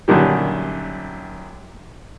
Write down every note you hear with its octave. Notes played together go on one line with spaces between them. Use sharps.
F#2 A#2 D3 D#3 G3